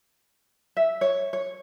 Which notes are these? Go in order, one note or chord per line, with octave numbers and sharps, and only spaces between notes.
E5
C#5
C#5